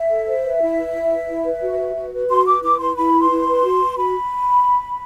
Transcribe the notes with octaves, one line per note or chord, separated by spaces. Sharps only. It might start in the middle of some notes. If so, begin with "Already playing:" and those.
Already playing: E5
A4
C5
B4
E4
B4
E4
B4
E4
B4
F#4
B4
F#4
B4
F#4 C6
B4 D6
E4 D6
B4 C6
E4 B5
B4
C6
E4
B4
F#4
B4
F#4 B5